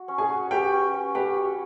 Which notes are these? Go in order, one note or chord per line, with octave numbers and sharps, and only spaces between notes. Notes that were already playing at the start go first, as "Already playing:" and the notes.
Already playing: F#4
C#4
G#4 G#5
F#4
G4 B4 G5
C#4
C#4
G4 B4 G5
F#4